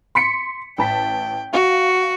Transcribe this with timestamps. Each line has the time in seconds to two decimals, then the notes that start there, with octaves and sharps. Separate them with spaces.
0.15 C6 B6 C#7
0.78 A1 G5 A5 B6
1.53 F#4 F5